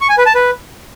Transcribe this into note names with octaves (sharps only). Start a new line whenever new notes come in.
C#6
G#5
B4
A5
B4